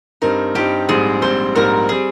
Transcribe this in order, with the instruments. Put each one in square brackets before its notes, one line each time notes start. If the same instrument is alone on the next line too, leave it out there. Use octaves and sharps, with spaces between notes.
[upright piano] G2 G3 C4 D#4 [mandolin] A#4
[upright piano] G2 G3 C4 D#4 [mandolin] G4
[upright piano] A#1 G#2 G3 C4 [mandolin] G#4
[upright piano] A#1 G#2 G3 C4 [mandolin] C5
[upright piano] A#1 G#2 G3 C4 [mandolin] A#4
[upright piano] G3 C4 [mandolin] G#4